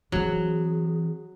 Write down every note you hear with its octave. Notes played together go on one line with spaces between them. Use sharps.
E3 F#3 C4 G#4